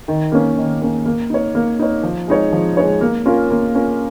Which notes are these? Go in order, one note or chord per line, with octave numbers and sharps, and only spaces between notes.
D#3
A#3 C#4
D#3
A#3 C#4
A#3
D#4 C#5
A#3
D#4 C#5
F3
G#3 D#4 C#5
F3
G#3 D#4 C#5
A#3
C#4 F4 A#4
A#3
C#4 F4 A#4